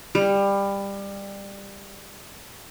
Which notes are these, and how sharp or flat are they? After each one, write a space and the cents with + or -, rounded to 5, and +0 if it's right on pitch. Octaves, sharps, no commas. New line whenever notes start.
G3 +20